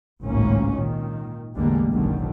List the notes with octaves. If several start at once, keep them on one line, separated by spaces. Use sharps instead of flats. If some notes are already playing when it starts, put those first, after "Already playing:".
G#1 C#2 A2 A#3 C#4
A#2 D#3
A1 E2 D3 G3 G#3 A#3
F#1 B1 F#2 D3 D#3